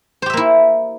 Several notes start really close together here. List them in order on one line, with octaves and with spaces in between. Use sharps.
C5 G4 E5 A#3 E4